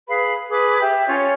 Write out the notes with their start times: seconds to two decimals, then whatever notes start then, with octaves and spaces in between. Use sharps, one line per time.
0.08 G#4 B4 F5 B5
0.50 G#4 B4 D6
0.80 G4 E5
1.07 C#4 F4 C#5